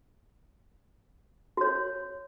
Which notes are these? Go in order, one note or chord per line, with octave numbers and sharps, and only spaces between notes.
F#4 C#5